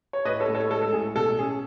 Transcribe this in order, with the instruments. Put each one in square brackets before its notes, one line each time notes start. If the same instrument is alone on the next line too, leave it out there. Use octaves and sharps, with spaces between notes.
[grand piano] C#5
A2 B4 D#5
A4 C#5
A2
A4 C#5
G#3 A4
A4
A2 G#4
B2 A4
C#4 G#4